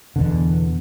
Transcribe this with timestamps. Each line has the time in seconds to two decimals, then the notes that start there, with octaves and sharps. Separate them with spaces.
0.16 E2 B2 D3